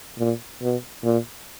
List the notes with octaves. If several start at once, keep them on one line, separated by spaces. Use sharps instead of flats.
A#2
B2
A#2